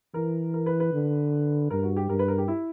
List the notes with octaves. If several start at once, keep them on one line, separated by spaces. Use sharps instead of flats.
E3 A#4
A#4
B4
B4
D3
G2 A#4
F#4
G4
G2 A#4
B4
A#4
G4
E4